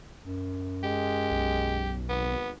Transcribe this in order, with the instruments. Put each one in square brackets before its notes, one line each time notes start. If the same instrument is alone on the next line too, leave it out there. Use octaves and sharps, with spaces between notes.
[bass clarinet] F#2
[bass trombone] G#3 [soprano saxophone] G4
[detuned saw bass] B1
[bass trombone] G#1 [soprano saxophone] B3